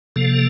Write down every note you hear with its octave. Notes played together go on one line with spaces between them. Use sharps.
C3 F3 A#3 A4